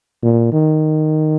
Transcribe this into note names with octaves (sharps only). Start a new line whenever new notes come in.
A#2
D#3